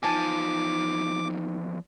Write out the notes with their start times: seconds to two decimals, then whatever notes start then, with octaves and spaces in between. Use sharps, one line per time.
0.03 E2 F3 D#4 G#5 A5 D6